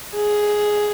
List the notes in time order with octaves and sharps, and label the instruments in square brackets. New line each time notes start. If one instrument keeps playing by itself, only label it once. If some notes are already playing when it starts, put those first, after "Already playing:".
[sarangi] G#4